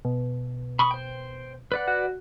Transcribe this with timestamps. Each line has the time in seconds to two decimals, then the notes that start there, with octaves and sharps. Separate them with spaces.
0.05 B2
0.79 B5 C#6 D#6
0.91 C5 G5
1.72 B4 D5 F#5
1.88 F#4